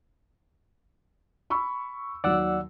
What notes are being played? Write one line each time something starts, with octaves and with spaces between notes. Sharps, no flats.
B5 C#6 E6
D#2 F#3 D5 F#5 E6